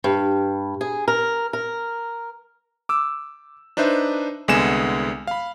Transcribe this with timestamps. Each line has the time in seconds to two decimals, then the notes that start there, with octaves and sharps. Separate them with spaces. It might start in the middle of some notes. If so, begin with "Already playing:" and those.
0.04 G2
0.81 G#4
1.08 A#4
1.53 A#4
2.89 D6 E6
3.77 D4 D#4 B4 C5 E5
4.48 C2 D3 G#3 B3 G#5 E7
5.27 F5 B5